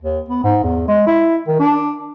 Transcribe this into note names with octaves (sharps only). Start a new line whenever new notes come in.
D#2
B3
G#2
E2
G#3
E4
D#3
D4